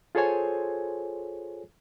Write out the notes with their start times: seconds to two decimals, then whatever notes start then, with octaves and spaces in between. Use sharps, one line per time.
0.15 F4 G#4 A4 C5 C#5 G#5